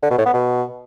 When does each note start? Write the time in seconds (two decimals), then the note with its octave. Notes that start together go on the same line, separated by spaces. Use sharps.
0.03 D3
0.10 B2
0.18 A2
0.26 B3
0.33 B2